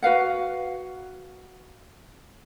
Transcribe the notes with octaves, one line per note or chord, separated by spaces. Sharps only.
F#4 B4 F5 F#5